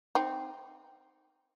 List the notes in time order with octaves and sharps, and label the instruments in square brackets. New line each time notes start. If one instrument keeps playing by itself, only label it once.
[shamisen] C4 D#4